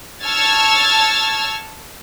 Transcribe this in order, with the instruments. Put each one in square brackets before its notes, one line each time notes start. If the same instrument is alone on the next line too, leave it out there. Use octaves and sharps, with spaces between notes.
[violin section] A5 C#6 E6 F6 G#6 A6